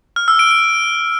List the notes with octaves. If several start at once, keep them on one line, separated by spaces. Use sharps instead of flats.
F6
E6
D7
D7